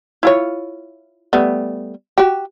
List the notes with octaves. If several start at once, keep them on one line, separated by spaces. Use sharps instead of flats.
E4 F4 C#5
G3 A3 B3
F#4 G4